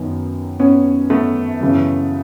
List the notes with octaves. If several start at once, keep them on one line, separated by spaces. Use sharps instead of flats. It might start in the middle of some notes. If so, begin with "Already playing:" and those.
Already playing: F#2 D#3 B3
B3 C#4
A3 B3
F#2 C#3 E3